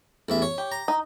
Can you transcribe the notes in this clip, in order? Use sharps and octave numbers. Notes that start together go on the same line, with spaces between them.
A1 E2 E5
C#5
G4
A#5
D#4